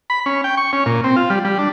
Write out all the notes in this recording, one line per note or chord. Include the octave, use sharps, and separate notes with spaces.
B5
C#4
G5
C#6
C#4
A#2
C4
F4
G3
G3
D4